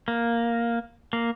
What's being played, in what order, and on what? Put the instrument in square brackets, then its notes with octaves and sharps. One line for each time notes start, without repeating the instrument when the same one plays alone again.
[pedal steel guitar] A#3
A#3